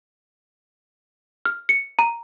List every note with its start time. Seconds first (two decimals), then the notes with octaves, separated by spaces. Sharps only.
1.45 F6
1.69 C#7
1.99 A#5